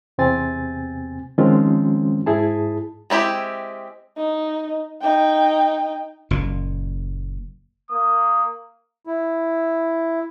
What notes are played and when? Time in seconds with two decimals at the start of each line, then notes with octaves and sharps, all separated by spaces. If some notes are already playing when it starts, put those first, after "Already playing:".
0.18 E2 C3 C4 G#5 A6
1.38 D#3 F3 G#3 C4 C#4 F4
2.26 G#2 E4 G#4 A5
3.10 G#3 C4 E4 G4
4.17 D#4
5.01 D#4 G5
6.31 F#1 A#2
7.91 A#3 D#6
9.07 E4